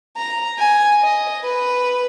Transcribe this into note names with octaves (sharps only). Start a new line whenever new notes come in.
A#5
G#5
D#5
B4